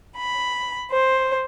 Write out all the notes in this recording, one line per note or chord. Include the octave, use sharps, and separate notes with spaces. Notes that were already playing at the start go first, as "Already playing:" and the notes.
B5
C5